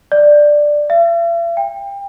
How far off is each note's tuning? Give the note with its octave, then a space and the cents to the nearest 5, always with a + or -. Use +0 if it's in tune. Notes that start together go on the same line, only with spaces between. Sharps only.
D5 +10
E5 +45
G5 +25